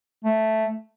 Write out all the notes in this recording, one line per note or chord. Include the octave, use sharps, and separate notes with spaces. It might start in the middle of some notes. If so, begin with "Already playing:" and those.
A3